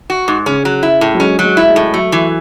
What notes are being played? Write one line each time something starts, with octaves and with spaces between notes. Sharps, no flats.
F#4
G#2
C#3 C#4
F#3
E4
A2
F#3
G#3 C#4
F#3
G#3
E4
G#3
A2
F#3 A3
E3